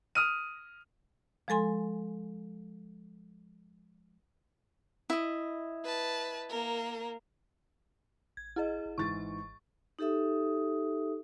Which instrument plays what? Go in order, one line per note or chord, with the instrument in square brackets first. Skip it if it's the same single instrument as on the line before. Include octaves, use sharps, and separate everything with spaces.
[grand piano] D#6 F6 D#7
[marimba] F3 G#3 A4 G#5 C6
[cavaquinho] E4 D#5
[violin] B4 A5
A#3 A#4
[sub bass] A1 [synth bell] G#6
[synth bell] E4 G#4 D#5
[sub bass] G#1
[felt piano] G#2 E3 A6 [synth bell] C#6
[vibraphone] D#4 G4 A4 E5 D#6